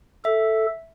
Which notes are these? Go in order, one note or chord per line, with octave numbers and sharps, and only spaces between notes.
A4 E5